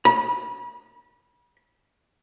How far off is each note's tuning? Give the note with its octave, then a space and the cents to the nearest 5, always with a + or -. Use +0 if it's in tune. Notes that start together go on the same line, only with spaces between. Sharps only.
B5 -35